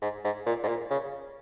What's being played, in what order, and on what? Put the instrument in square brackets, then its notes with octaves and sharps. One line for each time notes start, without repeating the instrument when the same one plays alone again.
[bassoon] G#2
G#2
A#2
G#2
A#2
C#3